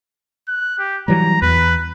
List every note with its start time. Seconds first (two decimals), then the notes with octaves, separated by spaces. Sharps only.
0.48 F#6
0.79 G4
1.08 E3 F#3 G3 A#5
1.42 E2 B4